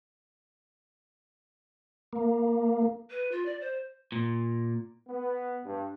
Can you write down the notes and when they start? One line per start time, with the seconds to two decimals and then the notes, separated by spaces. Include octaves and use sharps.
2.13 A#3
3.11 B4
3.32 F4
3.45 D5
3.61 C5
4.12 A#2
5.07 B3
5.64 G2